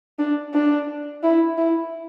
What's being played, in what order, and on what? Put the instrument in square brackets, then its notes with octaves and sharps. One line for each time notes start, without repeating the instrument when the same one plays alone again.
[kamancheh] D4
D4
E4
E4